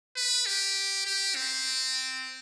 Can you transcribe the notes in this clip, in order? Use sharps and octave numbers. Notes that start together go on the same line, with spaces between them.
B4
G4
G4
C4